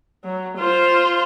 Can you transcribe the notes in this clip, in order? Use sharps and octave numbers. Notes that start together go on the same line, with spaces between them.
F#3
F4 C5